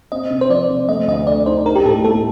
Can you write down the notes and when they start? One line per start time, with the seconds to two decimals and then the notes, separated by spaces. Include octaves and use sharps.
0.12 C4 D#5
0.30 C3
0.41 C5
0.50 F3 D5
0.70 C3
0.89 A3 D#5
1.08 D2 D#5
1.27 D3 D5
1.46 D#4 C5
1.66 D4 A#4
1.76 G4
1.86 A2 A4
2.04 A3 A4